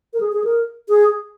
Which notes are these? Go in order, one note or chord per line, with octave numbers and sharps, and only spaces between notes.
A#4
G#4
G#4
A#4
G#4